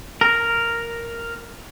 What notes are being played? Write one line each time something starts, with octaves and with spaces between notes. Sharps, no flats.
A#4